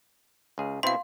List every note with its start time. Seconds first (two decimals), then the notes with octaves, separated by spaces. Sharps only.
0.58 C#2 G#4 F5
0.83 B2 C4 E4 F5 C6